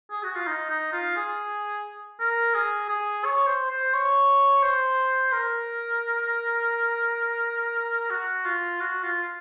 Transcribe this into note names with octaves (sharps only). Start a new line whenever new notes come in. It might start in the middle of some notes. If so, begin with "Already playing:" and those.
G#4
F#4
F4
D#4
D#4
F4
G#4
A#4
G#4
G#4
C#5
C5
C5
C#5
C5
A#4
F#4
F4
F#4
F4